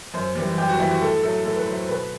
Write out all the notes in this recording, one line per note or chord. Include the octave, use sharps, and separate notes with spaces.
F#2 C5
E3 G3
F#2 G4
F#4
E3 G3 E4
F#4
A2 A4
F#3 A3 A4
A2 A4
B4
F#3 A3 C5
C5
B2 B4